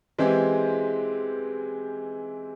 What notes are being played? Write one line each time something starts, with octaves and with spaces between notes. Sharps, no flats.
E3 G#3 C4 G4